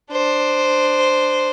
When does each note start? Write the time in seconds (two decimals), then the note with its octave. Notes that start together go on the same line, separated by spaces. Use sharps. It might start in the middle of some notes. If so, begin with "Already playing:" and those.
0.11 D4 C5